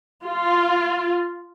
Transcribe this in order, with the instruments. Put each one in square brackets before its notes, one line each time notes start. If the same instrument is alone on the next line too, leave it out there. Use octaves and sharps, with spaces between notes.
[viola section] F4